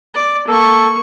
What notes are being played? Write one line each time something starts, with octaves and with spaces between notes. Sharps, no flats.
D5
A#3 A4 C#6